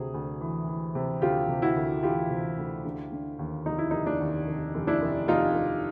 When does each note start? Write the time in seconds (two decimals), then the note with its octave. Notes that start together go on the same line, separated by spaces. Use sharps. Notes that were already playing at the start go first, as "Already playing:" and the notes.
Already playing: D2 C3 F#4 G#4
0.14 D2
0.41 E3
0.68 E3
0.95 C3
1.22 D2 F4 G4
1.48 C3
1.62 E4 F#4
1.76 D2
2.03 E3 F4 G4
2.30 C3
2.58 D2
2.85 D3
3.12 D3
3.39 D#2
3.66 F1 D#4
3.78 E4
3.91 F1 D#4
4.06 D4
4.20 D#2
4.47 F1
4.75 F1
4.87 D4 E4
5.02 F1
5.28 F1 D#4 F4
5.55 F1